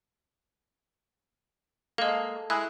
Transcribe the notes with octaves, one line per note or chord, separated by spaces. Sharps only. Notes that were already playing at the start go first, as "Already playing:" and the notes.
G#3 A#3 A4 D#5 F5
G#3 E4 G#4 F#6